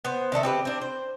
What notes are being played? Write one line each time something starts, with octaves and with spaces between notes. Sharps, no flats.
B3 C5
D#3 D4 A4 E5
C4 G4 B4
C4 D4
C5